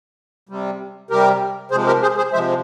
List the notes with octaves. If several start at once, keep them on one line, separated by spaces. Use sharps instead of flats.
C3 G3
C3 G3 G4 A#4
C3 F3 G#3 G#4 C5
G4 A#4
G#4 C5
G#4 C5
C3 F3 G#3 C5 E5